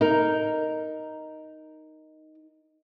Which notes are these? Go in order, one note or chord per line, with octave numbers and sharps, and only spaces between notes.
D#4 A#4